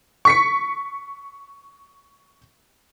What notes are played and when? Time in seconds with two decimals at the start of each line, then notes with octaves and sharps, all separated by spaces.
0.25 C#6 B6 C#7